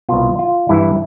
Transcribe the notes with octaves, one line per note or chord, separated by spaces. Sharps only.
C2 B2 F4
F4
G2 E3 E4